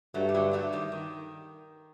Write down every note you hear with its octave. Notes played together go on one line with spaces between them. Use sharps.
G2 F#3 A3
G3
D3 F#3
F#3 A3
D#3 G3
D#3